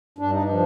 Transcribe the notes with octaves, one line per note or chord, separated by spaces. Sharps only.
G2 D4
D#4
D4
F3